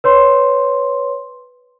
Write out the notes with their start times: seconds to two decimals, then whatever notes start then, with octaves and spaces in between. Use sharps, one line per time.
0.04 B4 C#5 C6